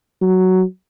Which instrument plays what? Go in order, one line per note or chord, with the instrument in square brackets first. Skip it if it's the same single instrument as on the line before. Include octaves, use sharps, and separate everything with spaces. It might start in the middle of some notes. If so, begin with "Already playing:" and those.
[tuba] F#3